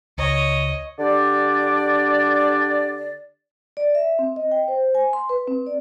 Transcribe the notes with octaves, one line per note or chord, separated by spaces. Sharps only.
C#2 C#5 D#5
D3 D4 G4 D5
D5
E5
C4
D#5
G5
C5
G#5
C6
B4
C4
D5